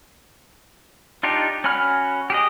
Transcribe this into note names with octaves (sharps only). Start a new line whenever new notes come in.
D4 D#4 F4 G4
C#4 F#4 G#5 B5 F6
G4 G#4 D#5